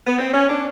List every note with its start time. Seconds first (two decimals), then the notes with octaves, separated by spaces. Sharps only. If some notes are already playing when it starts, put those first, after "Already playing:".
0.06 B3
0.18 C4
0.33 C#4
0.49 D4